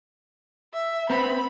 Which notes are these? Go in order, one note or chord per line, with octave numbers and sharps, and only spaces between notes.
E5
B3 C4 B5